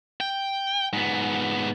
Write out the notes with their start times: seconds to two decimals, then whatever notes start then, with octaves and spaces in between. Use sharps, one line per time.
0.20 G5
0.93 G#2 B3